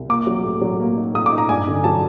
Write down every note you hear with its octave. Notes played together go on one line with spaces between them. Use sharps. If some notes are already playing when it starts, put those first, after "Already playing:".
Already playing: C2
A#3 D6
F#3
A2
F#3
A#3
D#4
A2 D#6
D6
D#4
A#5
G2 G#5
D3
F#3 A5